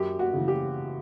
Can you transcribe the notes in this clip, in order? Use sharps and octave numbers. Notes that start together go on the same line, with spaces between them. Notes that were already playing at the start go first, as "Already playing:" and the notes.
Already playing: F#2 G4
F#4
C#3 E3
G4